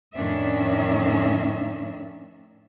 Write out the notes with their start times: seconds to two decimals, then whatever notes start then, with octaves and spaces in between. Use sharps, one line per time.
0.16 F2 A2 D#3 C#4 D4 E5